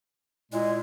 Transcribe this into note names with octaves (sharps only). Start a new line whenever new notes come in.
A#2 G#3 E4